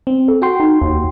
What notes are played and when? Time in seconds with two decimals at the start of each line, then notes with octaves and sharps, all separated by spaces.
0.07 C4
0.28 A4
0.42 F#4 G5 C6
0.60 D#4
0.81 D#2